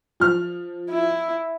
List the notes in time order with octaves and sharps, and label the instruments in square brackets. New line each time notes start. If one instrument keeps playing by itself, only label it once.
[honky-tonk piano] F3 F6
[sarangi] E4